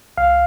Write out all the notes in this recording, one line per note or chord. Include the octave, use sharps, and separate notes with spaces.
C2 F5